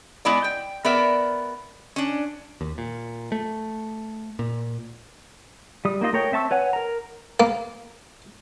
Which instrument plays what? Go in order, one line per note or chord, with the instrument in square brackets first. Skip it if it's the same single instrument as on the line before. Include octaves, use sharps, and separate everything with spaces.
[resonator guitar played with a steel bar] G#3 B3 E4 D5
G5
B3 A#4 D5 E5
C#4 D4
[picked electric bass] D#2
A#2
A3
A#2
[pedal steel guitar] G3 D#6
A#3 D#4 F4 D#5
A3 A#4 C#5 G5
C4 E5 A5 C#6 E6
B4 C#5 F#5 G#5
A#4 A#5
[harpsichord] A#3